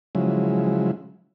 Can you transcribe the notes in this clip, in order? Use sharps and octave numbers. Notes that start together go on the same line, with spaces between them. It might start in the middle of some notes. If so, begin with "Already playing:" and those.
C#3 F3 F#3 G#3 E4